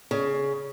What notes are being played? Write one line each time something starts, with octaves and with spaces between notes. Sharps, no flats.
C#3